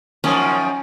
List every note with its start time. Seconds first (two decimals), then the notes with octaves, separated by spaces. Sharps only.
0.24 F#2 D#3 F3 C#4